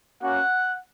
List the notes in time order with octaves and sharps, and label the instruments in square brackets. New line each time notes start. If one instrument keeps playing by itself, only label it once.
[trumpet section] A#3 C#4 F#4 F#5